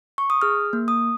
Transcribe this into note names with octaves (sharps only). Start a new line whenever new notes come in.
C#6
D#6
G#4 F6
A#3
D#6